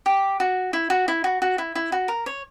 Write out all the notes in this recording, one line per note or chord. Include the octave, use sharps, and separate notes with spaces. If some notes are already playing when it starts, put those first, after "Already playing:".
G4
F#4
E4
F#4
E4
F#4
F#4
E4
E4
F#4
A#4
C#5